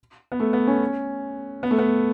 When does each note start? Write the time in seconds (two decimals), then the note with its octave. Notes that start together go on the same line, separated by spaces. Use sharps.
0.32 B3
0.40 A3
0.53 B3
0.67 C#4
1.63 B3
1.71 A3
1.78 B3